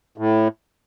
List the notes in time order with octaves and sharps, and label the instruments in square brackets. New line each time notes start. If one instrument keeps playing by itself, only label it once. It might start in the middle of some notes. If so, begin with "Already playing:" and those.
[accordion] A2